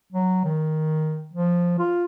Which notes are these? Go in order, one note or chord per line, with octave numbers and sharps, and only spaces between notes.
F#3
D#3
F3
F4